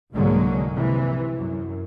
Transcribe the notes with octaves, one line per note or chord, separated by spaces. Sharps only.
C2 G#2 D3 F#3 G#3 A#3
C3 E3
F#2